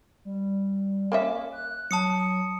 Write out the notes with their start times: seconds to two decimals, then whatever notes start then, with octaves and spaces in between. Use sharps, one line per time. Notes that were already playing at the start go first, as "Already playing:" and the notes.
0.25 G3
1.12 A#3 C#4 E5 D6
1.53 F#6
1.91 F#3 A5 D#6 C#7